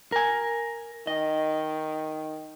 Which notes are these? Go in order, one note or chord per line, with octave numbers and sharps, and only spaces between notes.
A#4 G#5
D#3 D#5